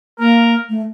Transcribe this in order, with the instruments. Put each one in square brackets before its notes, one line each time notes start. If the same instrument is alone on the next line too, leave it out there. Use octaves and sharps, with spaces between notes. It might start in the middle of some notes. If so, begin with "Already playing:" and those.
[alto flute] A#3 [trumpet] A#4
[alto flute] A3